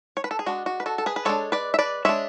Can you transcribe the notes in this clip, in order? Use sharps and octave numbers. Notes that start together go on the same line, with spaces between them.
C#5
B4
A4
G#4
G#3 D4 F#4
F#4
B4
F#4 A4
A4
G#4 B4
B4
G#3 D4 A4 C#5
B4 D5
E5
B4 D5
G#3 D4 C#5 E5